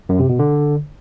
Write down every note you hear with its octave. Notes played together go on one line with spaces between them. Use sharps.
F#2
C3
B2
D3